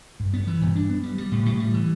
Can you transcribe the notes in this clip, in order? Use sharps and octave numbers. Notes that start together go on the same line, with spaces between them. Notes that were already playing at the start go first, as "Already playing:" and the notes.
G2
B3
E3
G2
D4
B3
G3
G3
A2
A2
G3
E3